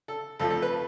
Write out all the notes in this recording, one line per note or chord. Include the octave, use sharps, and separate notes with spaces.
A4
F2 F3 A3 A4
A4
B4